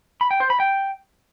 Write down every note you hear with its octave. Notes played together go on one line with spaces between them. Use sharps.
B5
G5
C5
B5
G5